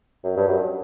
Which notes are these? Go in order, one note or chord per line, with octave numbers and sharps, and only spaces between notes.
F#2
G2
F#2